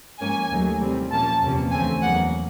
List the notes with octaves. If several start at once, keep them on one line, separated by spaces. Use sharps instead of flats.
G#2 F3 A#3 C#4 G#5
D#2 D#3 F#3 A3
C3 E3 G3 C4
A#2 F3 A#3 C#4 A5
E2 C3 F3 A#3 C#4
D2 C#3 E3 A3 C4 G#5
E2 C#3 F#3 A#3 F#5